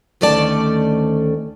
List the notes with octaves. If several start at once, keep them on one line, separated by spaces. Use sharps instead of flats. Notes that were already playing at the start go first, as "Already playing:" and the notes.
D2 D#3 A3 C#4 D5 A5